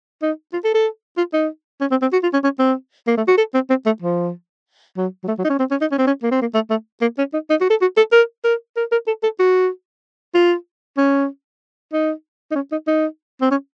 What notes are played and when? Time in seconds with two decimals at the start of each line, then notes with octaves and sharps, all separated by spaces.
0.22 D#4
0.53 F4
0.64 A4
0.75 A4
1.18 F4
1.33 D#4
1.81 C#4
1.91 C4
2.02 C4
2.13 F#4
2.23 F4
2.33 C#4
2.44 C#4
2.59 C4
3.07 A#3
3.17 A3
3.27 F#4
3.38 A4
3.54 C4
3.70 C4
3.86 A3
4.02 F3
4.97 F#3
5.24 F#3
5.28 A3
5.39 F#3
5.45 D#4
5.49 C#4
5.59 C4
5.71 C#4
5.81 D#4
5.91 C#4
5.98 C4
6.07 C#4
6.23 A#3
6.32 C4
6.41 A#3
6.54 A3
6.70 A3
7.02 A#3
7.18 C#4
7.34 D#4
7.50 D#4
7.61 F#4
7.70 A4
7.81 F#4
7.97 A4
8.12 A#4
8.44 A#4
8.77 A#4
8.92 A#4
9.07 A4
9.23 A4
9.39 F#4
10.35 F4
10.97 C#4
11.93 D#4
12.51 D#4
12.55 C#4
12.72 D#4
12.87 D#4
13.41 C4
13.51 C#4